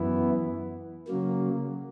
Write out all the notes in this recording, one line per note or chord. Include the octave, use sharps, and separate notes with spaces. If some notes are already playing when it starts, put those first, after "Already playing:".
Already playing: F#2 E3 B3 E4
C#3 F#3 A#3